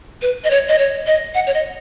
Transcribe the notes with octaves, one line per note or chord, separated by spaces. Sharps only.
B4
D#5
C#5
D#5
C#5
D#5
F#5
C#5
D#5